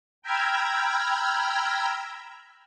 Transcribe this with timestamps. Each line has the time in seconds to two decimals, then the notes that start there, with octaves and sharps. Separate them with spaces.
0.22 G5 A#5 B5 E6 F6 G#6